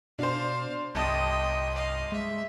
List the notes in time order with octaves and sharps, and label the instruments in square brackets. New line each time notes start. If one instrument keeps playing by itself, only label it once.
[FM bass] B2 [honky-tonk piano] D4 C5 [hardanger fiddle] F5
[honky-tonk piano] G1 A5 D#6 [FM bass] C2 [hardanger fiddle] D#5 G5
[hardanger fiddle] D#5 F5
[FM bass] G#3 [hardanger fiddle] E5